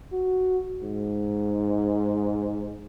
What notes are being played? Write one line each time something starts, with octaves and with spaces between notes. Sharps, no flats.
F#4
G#2